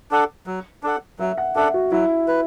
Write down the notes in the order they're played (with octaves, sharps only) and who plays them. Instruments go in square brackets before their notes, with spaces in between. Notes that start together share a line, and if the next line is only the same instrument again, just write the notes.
[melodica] D4 A4 F#5
F#3
D4 A4 F#5
[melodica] F#3 [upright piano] E5
[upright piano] F#5
[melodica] D4 A4 F#5 [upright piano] E5
[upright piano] F#4
[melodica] F#3 [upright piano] E4
[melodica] B4